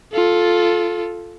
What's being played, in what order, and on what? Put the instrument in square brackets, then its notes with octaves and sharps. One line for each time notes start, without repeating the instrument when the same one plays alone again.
[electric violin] F4 A4